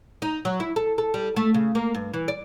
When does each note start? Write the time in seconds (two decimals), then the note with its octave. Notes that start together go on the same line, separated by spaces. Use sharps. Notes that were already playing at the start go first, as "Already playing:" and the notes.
0.22 D#4
0.45 F#3
0.60 E4
0.76 A4
0.98 A4
1.14 G3
1.36 A3
1.54 C#3
1.75 A#3
1.94 G2
2.14 E3
2.28 D5